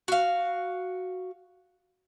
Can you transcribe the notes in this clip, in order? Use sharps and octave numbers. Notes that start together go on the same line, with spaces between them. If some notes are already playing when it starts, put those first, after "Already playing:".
F#4 F5